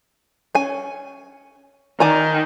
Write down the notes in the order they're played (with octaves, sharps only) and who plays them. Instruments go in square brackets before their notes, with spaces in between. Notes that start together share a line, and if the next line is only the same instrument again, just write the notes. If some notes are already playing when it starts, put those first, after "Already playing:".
[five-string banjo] C#4 G#5
[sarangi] D#3 [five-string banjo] D5 G#5 A#5